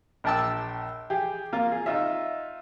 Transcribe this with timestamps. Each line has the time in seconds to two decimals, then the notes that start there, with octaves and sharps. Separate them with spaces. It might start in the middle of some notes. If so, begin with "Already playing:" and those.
0.24 A#1 A#4 G5 A5 D6 E6
1.10 G4 G#4
1.53 A#3 F4
1.72 G#4
1.86 D#4 F4 D#5 E5